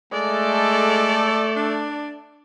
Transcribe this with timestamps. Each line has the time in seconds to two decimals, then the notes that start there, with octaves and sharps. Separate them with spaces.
0.13 G#3 A3 A4 D5
1.56 D4